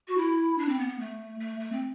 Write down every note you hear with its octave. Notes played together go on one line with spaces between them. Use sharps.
F#4
E4
D4
C4
B3
B3
A3
A3
A3
C4